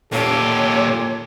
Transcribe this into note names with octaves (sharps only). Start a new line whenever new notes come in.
A#2 G4 A4 C#5